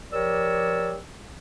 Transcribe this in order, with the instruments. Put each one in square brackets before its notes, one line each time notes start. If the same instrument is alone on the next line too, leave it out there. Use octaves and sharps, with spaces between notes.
[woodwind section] F3 G4 A#4 C#5 D5 E6